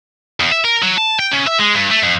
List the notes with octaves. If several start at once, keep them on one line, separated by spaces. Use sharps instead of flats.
E2
E5
A#4
F#3
A5
G5
C#3
E5
G#3
G2
A3
F2